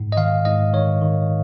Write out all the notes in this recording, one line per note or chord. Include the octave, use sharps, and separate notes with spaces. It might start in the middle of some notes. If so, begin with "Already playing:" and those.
Already playing: G#2
D#5
D#3 F5
G#2 D#5
D#3 C#5
D#3